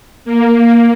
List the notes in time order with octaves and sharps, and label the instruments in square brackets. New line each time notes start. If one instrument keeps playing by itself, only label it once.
[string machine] A#3